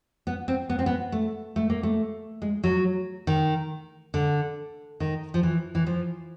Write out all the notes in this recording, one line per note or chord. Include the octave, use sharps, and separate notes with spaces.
B3
C4
B3
C4
B3
A3
A3
A#3
A3
G#3
F#3
D#3
D3
D#3
F3
E3
E3
F3